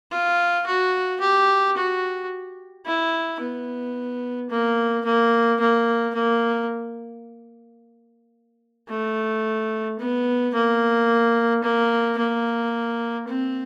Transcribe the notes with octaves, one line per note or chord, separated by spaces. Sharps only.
F4
F#4
G4
F#4
E4
B3
A#3
A#3
A#3
A#3
A3
B3
A#3
A#3
A#3
C4